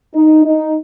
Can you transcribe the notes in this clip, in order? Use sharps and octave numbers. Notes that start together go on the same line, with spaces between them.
D#4
D#4